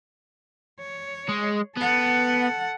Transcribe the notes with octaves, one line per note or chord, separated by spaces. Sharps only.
C#5
G#3
B3 A4 F#5